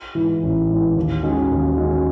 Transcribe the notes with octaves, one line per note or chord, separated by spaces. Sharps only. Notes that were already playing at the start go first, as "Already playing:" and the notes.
G#2 E3
A1
G#2
E3
D#2
D#3 G#3 C#4 F#4
D#2
D#3 G#3 C#4 F#4